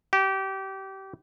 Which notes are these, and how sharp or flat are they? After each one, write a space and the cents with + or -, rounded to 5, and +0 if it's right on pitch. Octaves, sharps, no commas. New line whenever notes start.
G4 -25